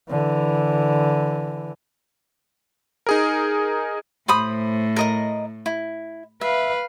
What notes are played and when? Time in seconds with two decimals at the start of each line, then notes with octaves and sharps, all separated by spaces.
0.10 D3 E3
3.07 D#4 G#4 A#4
4.28 A2 C5 B5 D#6
4.96 A#4 D#5 D#6
5.66 E4
6.41 B4 E5 F5